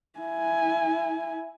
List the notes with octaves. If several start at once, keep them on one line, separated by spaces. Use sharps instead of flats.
E4 G#5